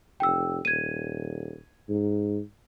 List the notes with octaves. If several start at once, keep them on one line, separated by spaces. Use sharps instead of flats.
F1 G5 E6
D#1 G#6 D#7
G#2